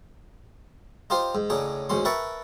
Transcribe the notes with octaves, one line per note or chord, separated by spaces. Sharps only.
D#4 F4 G4 C5 F5
G#2
A2 C#3 D4 D#4 G#4
D2 G#2 C#4 C6
A#4 B4 E5 G5 A5 C#6